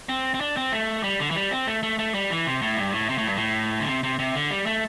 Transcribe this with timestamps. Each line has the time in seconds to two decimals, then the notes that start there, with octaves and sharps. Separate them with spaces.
0.09 C4
0.34 C4
0.41 D4
0.57 C4
0.72 A3
1.03 G3
1.20 D3
1.31 E3
1.35 G3
1.51 C4
1.67 A3
1.83 A3
1.99 A3
2.14 G3
2.30 E3
2.46 C3
2.62 A2
2.77 G2
2.93 A2
3.09 C3
3.18 A2
3.27 G2
3.37 A2
3.80 D3
3.88 C3
4.03 C3
4.19 C3
4.35 D3
4.51 G3
4.66 A3